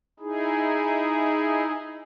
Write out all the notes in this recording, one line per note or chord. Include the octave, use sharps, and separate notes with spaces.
D#4 E4 G#4